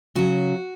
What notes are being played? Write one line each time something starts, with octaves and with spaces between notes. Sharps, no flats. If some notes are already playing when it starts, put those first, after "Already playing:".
C#3 F#3 F#4